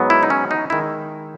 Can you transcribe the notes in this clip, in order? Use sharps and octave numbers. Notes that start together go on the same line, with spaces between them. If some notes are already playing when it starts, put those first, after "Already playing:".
Already playing: G#2 F#3 B3
E4
D#4
C#4
D#4
D#3 G#3 E4